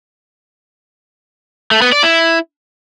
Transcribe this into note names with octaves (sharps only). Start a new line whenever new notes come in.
A3
B3
D5
E4